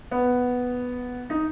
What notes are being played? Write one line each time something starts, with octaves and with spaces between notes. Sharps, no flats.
B3
D#4